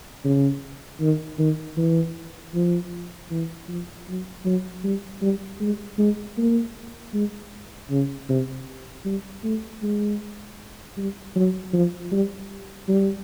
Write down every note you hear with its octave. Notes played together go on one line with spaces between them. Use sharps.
C#3
D#3
D#3
E3
F3
E3
F3
F#3
F#3
G3
G3
G#3
G#3
A#3
G#3
C#3
C3
G3
A3
G#3
G3
F#3
F3
G3
G3